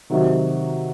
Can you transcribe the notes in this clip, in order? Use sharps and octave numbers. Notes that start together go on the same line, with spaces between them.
C3 D#3 F#3